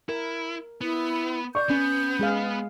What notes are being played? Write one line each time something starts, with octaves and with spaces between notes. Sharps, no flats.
E4 A#4
B3 E4
D5 C#6 G6
B3 C#4
G#3 G#4 F5